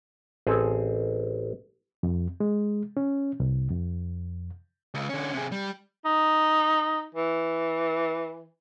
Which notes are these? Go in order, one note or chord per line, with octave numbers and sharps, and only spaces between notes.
A1 C4 G#4 A4
F2
G#3
C#4
C2
F2
C#2
D3 C#4
C3 G#4
G3
D#4
E3